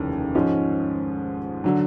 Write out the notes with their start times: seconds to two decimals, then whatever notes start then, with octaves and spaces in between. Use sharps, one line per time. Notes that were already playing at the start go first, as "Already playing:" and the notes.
Already playing: F1 D#2 C#3 E3
0.35 G#2 F3 G#3 C#4
1.64 D3 F#3